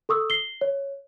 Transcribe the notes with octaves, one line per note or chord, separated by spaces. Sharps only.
A4 C#6 D#6 E6
C7 G7
C#5